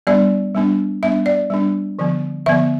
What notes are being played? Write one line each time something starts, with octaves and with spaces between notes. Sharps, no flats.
G3 B3 D4 D5
G3 B3 D4
G3 B3 D4 E5
D5
G3 B3 D4
D3 F3 B3
D3 F3 B3 E5